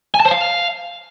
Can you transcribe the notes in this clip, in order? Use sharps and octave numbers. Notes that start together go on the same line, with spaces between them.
G#5
A5
C5
F5